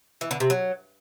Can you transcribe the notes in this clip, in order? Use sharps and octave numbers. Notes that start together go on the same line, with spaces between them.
E3
D3
C3
F#3